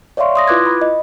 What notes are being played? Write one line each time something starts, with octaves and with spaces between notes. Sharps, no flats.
C#5 D5 E5 F5 C6 C#6
C6 D#6 A#6
E4 F4 B4 D6 F#6 G#6
B5
D#5